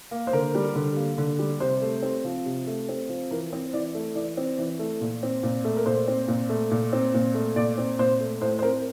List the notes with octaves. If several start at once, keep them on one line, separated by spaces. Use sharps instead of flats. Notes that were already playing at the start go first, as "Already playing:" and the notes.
A#3
C5
D3 A#4
G3
D3
A#3
D3
G3
C3 C5
A3
C4
F3
C3
A3
C4
F3
E3 A#4
C4 C5
E3 D5
A3
E3 D5
C4
E3
A3
A#2
C4
A#2
A3
A#4
A#2 C5
C4
A#2
A3
A#2
C4
A#2
A3
A#2 D5
C4
A#2 C5
A3
A2 C5
C5
C4 A#4